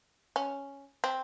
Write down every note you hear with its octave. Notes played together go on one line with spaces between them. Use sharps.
C#4
C4